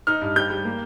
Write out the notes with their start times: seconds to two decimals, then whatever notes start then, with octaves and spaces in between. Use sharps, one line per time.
0.07 D#4 F6
0.21 G2
0.36 G3 G6
0.50 G3
0.65 A#3